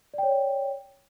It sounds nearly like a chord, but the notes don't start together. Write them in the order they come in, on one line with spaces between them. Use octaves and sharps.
D5 G5 C#5